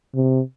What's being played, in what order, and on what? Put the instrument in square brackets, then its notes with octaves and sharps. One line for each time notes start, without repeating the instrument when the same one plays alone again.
[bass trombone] C3